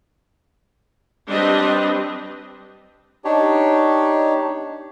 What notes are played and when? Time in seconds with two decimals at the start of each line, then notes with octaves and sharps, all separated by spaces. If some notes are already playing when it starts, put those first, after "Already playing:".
1.29 G3 C4 D4 B4 D#5
3.24 D4 D#4 G4 C#5